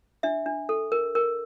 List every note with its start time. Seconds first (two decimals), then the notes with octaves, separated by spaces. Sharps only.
0.23 D4 E5
0.46 D4
0.69 A4
0.92 A#4
1.15 A#4